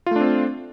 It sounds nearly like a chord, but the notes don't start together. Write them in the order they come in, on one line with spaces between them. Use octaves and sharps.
F4 A3 D4 C4